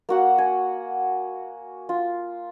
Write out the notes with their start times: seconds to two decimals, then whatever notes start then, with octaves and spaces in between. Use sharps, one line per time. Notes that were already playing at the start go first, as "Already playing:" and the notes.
0.09 A#3 F#4 F#5
0.38 G#5
1.89 F4